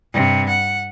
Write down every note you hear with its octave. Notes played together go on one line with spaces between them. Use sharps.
G2 C3
F#5